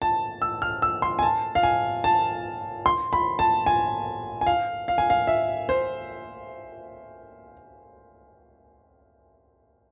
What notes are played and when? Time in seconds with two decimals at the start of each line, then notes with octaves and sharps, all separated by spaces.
0.02 A5
0.42 E6
0.62 F6
0.82 E6
1.02 C6
1.19 G#5
1.23 A5
1.55 F5
1.63 G#5
2.04 A5
2.86 C6
3.13 B5
3.39 A5
3.66 G#5
4.41 G#5
4.47 F5
4.88 F5
4.98 G#5
5.10 F5
5.27 E5
5.69 C5